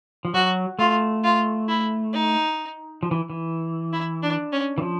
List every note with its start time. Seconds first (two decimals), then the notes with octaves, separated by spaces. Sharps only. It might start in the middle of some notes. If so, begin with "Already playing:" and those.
0.25 F3
0.34 F#3 F#4
0.79 A3 F4
1.24 F4
1.68 E4
2.13 D#4
3.03 F3
3.11 E3
3.30 E3
3.93 E4
4.23 D4
4.52 C#4
4.78 E3
4.82 F3